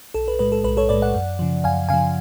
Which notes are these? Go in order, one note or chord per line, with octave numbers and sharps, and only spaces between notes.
B1 A4
B4
A2 G#3 B4
A4
B1 B4
A4 C#5
A2 G#3 B4 D5
D5 F#5
F#2
C#3 F3
F#2 F5 G#5
C#3 F3 F5 G#5